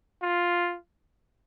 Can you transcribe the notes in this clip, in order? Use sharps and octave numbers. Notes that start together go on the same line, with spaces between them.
F4